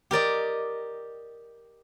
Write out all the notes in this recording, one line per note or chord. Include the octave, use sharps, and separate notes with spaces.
G4 A#4 D5 D#5